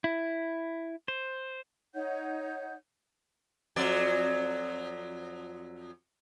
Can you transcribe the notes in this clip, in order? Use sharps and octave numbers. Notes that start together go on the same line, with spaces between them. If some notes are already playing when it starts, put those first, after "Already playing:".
E4
C5
D#4 C#5 F#5 G6
F2 F#3 D5